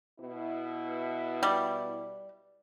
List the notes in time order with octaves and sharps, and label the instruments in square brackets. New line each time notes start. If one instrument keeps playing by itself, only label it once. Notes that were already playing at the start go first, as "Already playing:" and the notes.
[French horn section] B2 E4
[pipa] G3